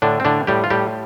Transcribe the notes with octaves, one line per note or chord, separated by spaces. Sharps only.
A2 D3 D4
C4
A2 D3 D4
A2 G3 G4
F4
A2 G3 G4